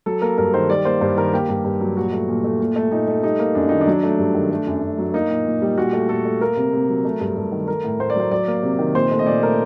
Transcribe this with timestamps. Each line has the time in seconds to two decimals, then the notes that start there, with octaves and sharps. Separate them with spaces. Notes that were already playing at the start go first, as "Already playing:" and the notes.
0.06 F#3 A4
0.22 A#3 A#4
0.38 G2 A#4
0.54 D#3 C5
0.70 G3 D5
0.85 A#3 C5
1.01 G2 C5
1.17 D#3 A#4
1.33 A#3 G4
1.49 G2
1.64 G2
1.81 F#3
1.97 A#2 F#4
2.12 A3
2.29 A#2
2.44 A3
2.60 A#2
2.76 A3
2.91 A#2 D#4
3.08 A3
3.23 G3 D#4
3.39 A#3
3.55 F#2 D4
3.69 D#3 D#4
3.81 D4
3.87 F#3
4.03 A3
4.19 G2
4.35 D#3
4.51 A3
4.67 F#2
4.82 F#2
4.98 F#3
5.14 A#3 D#4
5.30 A#2
5.46 A#2
5.62 G3
5.78 A#2 F#4
5.93 A3
6.09 A#2 A4
6.25 A3
6.41 A#3 A#4
6.57 C3
6.73 C3
6.89 F#3
7.05 A3
7.21 G2
7.36 G2
7.52 D#3
7.68 A3 A#4
7.84 A2
8.00 A2 C5
8.10 D5
8.16 F#3 C5
8.31 F#3 D5
8.48 A#3
8.63 C3
8.79 D#3
8.95 A#2 C5
9.11 A3
9.19 D#5
9.26 A#2 D5
9.43 A3 A#4